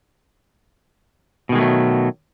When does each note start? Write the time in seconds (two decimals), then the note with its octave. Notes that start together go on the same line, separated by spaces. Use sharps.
1.49 B2
1.52 D#3
1.55 G#3
1.58 A3
1.61 F#3